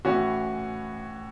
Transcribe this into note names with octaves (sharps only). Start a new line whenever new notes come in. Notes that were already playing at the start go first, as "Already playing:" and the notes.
A2 E3 C#4 F#4